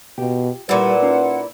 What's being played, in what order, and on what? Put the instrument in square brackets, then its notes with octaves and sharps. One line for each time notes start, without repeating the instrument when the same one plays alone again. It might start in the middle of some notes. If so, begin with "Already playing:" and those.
[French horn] B2 [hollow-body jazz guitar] F4 G4
[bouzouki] A#2 E4 [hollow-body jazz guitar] G3 A#4 [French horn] B4 [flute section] F#5
[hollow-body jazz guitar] C#4 D#4 F4